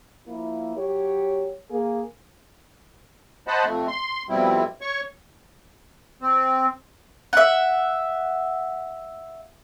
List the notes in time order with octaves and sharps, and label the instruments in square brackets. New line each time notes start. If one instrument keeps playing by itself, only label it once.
[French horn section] F3 A#3 E4
F#3 G4 C#5
A#3 G#4
[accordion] C5 D#5 F#5 A5 B5
F2 A3
C6
F2 B2 G3 C4 E4
C#5 C#6
C4
[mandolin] E5 F#5